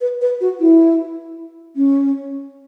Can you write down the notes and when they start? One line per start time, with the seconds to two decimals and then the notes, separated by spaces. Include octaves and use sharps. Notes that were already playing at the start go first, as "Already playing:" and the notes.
0.01 B4
0.21 B4
0.41 F#4
0.60 E4
1.76 C#4